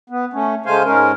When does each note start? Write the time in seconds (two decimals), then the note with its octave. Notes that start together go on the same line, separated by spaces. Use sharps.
0.10 B3
0.33 A3 C#4
0.66 C#3 G#3 A3 C5 F5 G#5
0.85 G#2 G#3 C#4 A#4